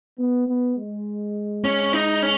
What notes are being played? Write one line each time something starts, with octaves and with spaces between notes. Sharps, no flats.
B3
B3
G#3
C#4
D#4
C#4